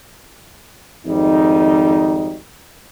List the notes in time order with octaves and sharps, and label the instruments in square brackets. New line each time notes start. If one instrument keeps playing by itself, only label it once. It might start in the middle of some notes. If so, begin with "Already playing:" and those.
[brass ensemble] G#1 F2 G3 D#4